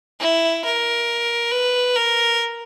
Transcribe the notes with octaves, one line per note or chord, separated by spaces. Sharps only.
E4
A#4
B4
A#4